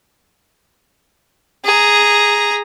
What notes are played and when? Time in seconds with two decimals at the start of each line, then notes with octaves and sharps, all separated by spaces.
1.65 G#4 A#5